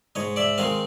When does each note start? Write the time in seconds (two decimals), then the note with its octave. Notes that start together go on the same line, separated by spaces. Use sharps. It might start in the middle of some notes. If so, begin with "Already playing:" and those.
0.15 G#2 C#5 D#5
0.36 D5 E5
0.58 D#3 G#3 C4 D#5 F5